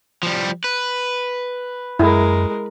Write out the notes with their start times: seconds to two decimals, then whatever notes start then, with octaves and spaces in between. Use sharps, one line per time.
0.23 F3 G3
0.64 B4
1.99 F#2 G#3 E4 A#4